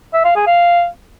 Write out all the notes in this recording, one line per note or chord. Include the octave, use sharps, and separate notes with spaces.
E5
F5
G#4
F5